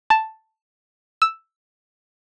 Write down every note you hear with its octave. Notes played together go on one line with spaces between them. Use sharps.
A5
E6